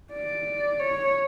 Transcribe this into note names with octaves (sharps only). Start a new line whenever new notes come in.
D5
C#5